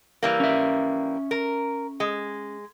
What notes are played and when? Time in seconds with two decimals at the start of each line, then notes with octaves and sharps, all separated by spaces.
0.23 E3 G3 A#3
0.40 C#4 E5
1.31 A#4
2.00 G#3